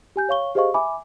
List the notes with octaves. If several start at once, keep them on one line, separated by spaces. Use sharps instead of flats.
G4 G#5 G6
C#5 F5 C#6 G7
G4 G#4 C5 D#5 F5 C#6
E5 G#5 B5 D6